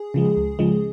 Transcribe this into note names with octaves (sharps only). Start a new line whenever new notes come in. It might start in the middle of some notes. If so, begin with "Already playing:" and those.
Already playing: G#4
C#3 F3 G#3
C#2
C#3 F3 G#3